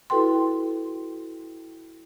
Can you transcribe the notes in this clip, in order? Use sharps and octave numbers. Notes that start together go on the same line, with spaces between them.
E4 F#4 A4 B4 G5 C6